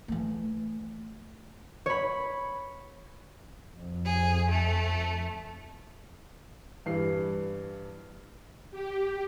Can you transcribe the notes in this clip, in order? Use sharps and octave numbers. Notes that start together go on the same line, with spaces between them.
E3 A3
C#5 B5
F2
G#4
A3
G2 E3 C7
G4